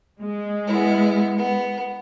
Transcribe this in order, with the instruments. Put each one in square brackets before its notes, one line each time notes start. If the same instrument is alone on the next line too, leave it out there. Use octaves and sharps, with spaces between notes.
[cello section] G#3
[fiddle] B3 E4
B3